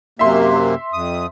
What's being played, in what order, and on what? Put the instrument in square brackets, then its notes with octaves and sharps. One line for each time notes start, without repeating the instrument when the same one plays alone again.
[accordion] F#2 C3 A#3 [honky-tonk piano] E5 C6
[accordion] F2 D#6